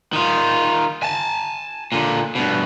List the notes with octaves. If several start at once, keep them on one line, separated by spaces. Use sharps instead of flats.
D#3 F4
G#5 A5
A#2 D3
G2 B2